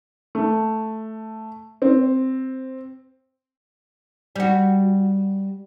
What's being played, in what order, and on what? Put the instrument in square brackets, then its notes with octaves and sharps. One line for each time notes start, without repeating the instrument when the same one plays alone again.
[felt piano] A3
C4
[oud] G3 F#4